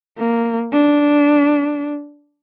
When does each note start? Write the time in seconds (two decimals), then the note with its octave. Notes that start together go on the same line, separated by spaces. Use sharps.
0.19 A#3
0.73 D4